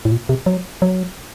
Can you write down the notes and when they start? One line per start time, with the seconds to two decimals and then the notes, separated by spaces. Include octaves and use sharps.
0.05 A2
0.12 A#2
0.29 C3
0.46 F#3
0.82 F#3